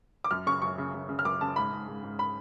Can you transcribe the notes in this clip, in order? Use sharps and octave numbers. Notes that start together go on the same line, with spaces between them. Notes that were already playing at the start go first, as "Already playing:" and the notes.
D6
F#2 F6
C#3 C#6
F#2 C#6
C#3
C#3
C#3
F6
F#2 D6
C#3 A5
G#2 B5
G#2
G#2
G#2
B5